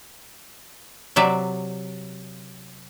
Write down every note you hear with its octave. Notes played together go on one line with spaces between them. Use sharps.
C3 F#3 D5 E5